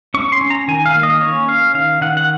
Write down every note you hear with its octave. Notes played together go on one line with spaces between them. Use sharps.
C#4 C#6
C6
C#4
A#5
D#3 G#5
F5
A#3
D#5
C#4 C#5
C#4 F5
D#3 F5
D#3 F#5
F#5